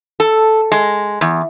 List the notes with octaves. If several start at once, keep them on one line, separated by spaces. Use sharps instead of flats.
A4
G#3
E2